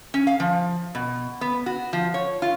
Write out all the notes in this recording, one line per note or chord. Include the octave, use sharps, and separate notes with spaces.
C#4
F5
F3
B2
B3
F#4
F3
C#5
F4